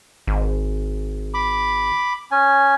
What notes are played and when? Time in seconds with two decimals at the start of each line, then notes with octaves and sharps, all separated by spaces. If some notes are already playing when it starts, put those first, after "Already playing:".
0.27 G#1
1.34 B5 D6
2.31 C#4 G#5